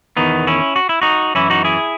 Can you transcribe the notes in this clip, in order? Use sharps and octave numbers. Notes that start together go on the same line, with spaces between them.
E2 D#3 B3 D#4
C#4 E4
F#4
E4
D#4 F#4
F#2 E3 C#4 E4
D#4 F#4
E4 G#4